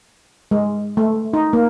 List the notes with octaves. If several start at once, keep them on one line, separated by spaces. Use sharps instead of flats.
G#3
A3
D#4
A#3